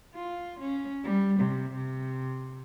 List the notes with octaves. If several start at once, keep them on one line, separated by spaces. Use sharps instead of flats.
F4
C#4
G3
C3
C3